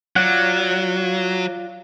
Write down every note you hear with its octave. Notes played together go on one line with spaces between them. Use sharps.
F#3 F4 D5 F#5